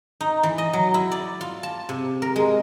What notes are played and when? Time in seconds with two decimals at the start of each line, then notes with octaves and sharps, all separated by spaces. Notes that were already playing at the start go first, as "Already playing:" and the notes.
0.21 D#4
0.43 E3
0.58 D#5
0.73 F#3
0.94 E4
1.12 D5
1.41 F4
1.63 A5
1.89 C3
2.22 A#4
2.36 G#3